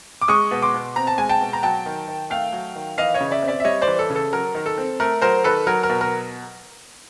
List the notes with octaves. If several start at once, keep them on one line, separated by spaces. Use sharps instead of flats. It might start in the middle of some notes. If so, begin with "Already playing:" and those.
D6
G#3 C#6 D#6
B2
C6 D6
B2
C4 A#5
A5
G#3 G#5
G5 A5
B2
A#5
F#3 G5 A5
D#3
D#3
A3 F5 G5
F#3
D#3
E3 D#5 F5
C#5 D#5
C#3
D5 E5
C4
D5 E5
E5
G3 C#5 D#5
C5 D5
E3
A4
C#3
A4
F#3 A#4
D#3
A4
C4
A3 A#4
F#3 A#4 C5
D#3 A4 B4
F#3 A#4
A#4
B2
A#4